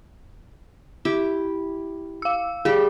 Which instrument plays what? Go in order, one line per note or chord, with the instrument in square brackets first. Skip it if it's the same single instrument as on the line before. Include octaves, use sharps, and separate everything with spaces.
[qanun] E4 G4
[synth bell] F5 E6
[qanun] G3 G4 [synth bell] G#4